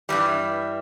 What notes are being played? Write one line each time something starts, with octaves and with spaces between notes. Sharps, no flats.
G2 E3 G3